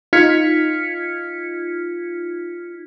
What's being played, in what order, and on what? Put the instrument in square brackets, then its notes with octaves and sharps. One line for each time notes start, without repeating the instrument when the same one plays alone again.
[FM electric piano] D#4 F4 F6 G#6 B6 C#7